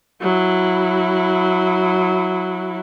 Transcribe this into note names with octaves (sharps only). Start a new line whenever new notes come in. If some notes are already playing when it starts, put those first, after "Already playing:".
F#3 E4